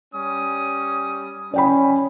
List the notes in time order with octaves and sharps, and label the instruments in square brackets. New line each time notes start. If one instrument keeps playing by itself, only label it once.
[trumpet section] G3 C#4 D#6
[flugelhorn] C#4 [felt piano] D5 G5 B5